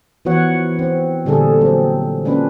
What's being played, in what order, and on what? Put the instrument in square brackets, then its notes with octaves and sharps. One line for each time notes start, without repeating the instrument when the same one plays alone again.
[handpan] E3 F3 B3 F#4 C#5 F#5
C4
A#2 D3 G3 D4 G#4 A4
F#3 C4
G#3 A#3 C#4 D4 F4 B4